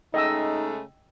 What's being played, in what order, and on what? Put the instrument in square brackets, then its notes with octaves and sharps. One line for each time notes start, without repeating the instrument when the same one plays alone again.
[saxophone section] C#3 G#3 A3 [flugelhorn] D#4 [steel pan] D#5 G5 E6